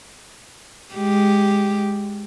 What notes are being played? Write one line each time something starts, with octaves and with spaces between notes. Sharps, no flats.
G#3 G4